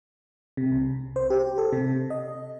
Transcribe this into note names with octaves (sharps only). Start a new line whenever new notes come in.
C3
C2
C5
G4
A4
C3
D#5